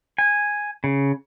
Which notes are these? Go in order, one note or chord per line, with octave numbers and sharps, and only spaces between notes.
G#5
C#3